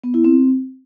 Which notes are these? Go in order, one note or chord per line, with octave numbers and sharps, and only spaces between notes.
B3
E4
C4